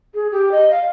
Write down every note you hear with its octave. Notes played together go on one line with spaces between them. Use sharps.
G#4
G4
D#5
F5